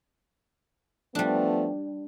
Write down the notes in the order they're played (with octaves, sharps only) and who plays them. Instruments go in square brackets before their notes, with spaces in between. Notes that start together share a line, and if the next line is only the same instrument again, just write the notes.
[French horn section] F3 A3 B3 [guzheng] G3 D4